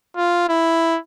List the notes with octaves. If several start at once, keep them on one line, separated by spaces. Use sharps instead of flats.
F4
E4